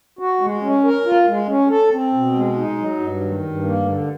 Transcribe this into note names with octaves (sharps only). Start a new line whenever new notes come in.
F#4
G#3
C#4
A#4
F4
G#3
C#4
A4
C4
B2
G#3
D#4
F#3
G2
D#3
G2
A#3
D3